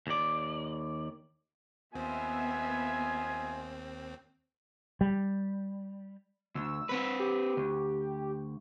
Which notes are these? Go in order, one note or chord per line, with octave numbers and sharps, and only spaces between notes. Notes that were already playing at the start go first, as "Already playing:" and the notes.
D#2 D5
D#2 B3 C4 F4 D#5 E5 G#5
G3
D2 E6
C4 B4
G4
D2